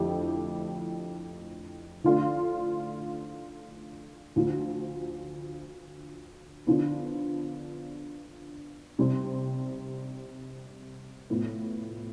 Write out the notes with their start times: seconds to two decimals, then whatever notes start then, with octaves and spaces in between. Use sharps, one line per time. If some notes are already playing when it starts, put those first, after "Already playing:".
Already playing: F2 D3 A3 E4 G4
2.04 D3 F3 A3 D4 F4
4.36 D2 D3 F3
6.67 D3 F3 B3
8.99 C3 G3 C4
11.30 A2 F3 B3